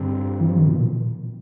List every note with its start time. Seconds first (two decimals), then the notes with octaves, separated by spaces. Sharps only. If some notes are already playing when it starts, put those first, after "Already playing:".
Already playing: G2 D3 G3 C4
0.40 E3
0.49 F3
0.59 D#3
0.68 B2
0.78 A#2